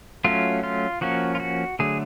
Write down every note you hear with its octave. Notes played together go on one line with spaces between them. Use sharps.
F#3 A3 C#4 F4
F4
F3 A#3 C#4 F#4
F4
F#4
D3 F#3 A3 G#4